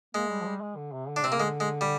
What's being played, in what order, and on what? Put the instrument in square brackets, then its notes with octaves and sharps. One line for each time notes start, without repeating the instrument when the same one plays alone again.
[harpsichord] G#3 [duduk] A#3
[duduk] G3
F3
G3
G#3
D3
C3
D3
[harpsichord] D4
[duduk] C3 [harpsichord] C4
[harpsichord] A#3
[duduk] D3 [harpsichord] G#3
[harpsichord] G#3
G3